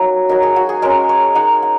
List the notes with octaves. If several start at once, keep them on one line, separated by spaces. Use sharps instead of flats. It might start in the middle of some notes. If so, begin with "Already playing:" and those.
Already playing: F#3 A#3 C#4 D#4 C#5
F#3 D#4 A#4
G#4
F#4
G#4
G#3 C#4 A#4
C#5
G#3 D#4 F#5
F#5